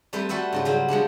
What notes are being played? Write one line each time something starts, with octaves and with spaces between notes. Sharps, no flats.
G3 A3 C4 B4
G3 F#4 A4 B4 E5
G#2 C#3 F4
C#3 F#3 G3 F#4
F3 G#3 B3 D4